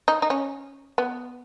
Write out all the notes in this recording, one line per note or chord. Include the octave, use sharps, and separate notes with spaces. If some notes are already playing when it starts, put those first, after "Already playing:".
D#4
D#4
C#4
B3